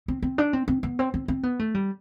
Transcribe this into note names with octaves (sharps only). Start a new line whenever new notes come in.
C4
C4
D4
C4
C4
B3
C4
C4
C4
B3
A3
G3